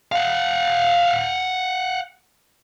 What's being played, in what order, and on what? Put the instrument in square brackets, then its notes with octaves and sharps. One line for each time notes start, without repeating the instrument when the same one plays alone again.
[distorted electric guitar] F5 F#5